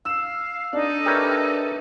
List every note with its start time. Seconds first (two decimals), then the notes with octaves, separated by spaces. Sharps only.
0.05 F5 E6 E7
0.73 D4 D#4 A4
1.06 G4 A#4 B4 C#5 E5